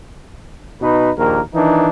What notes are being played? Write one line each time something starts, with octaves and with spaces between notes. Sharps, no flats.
B2 D#4 B4
A#1 D#2 A#3 A#4
D#3 E3 D4 D#4